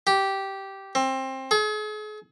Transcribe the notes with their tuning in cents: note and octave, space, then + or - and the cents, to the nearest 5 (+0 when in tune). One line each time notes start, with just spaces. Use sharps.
G4 -10
C4 +20
G#4 +40